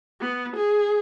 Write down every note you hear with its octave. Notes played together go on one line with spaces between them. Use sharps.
B3
G#4